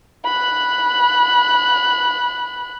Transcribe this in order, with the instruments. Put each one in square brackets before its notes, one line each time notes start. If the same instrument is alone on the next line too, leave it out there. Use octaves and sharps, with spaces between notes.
[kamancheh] B5 F#6